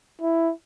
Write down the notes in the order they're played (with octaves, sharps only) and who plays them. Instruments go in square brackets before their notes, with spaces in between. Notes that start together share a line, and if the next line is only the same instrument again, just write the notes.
[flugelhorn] E4